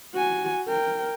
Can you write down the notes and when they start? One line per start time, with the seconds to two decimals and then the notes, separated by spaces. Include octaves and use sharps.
0.14 F#4 G#5
0.68 A#4 G5